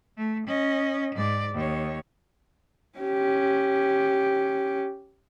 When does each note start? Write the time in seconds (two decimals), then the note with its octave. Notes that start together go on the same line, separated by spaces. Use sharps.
0.18 A3
0.47 C#4 D#5
1.15 G#2 D5
1.54 D#2 C#5
2.99 C#4 G4